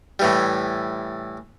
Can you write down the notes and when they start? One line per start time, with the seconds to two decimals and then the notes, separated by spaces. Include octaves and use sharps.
0.19 A2 E3 G3